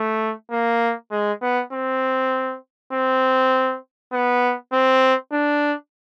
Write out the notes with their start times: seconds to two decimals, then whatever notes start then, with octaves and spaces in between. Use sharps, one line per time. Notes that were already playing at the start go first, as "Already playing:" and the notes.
Already playing: A3
0.51 A#3
1.11 G#3
1.42 B3
1.73 C4
2.93 C4
4.13 B3
4.73 C4
5.33 D4